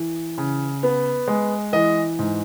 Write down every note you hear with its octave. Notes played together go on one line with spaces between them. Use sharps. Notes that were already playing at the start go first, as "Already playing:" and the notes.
Already playing: E3
C#3
B3
G#3
E3 D#5
G#2